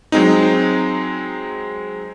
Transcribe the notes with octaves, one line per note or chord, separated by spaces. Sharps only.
F#3 G#3 C4 D#4